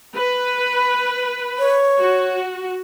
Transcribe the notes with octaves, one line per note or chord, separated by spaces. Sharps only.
B4
C#5
F#4